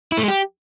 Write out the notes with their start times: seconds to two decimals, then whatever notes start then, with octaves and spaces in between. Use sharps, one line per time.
0.12 E4
0.17 A3
0.23 G#3
0.28 G4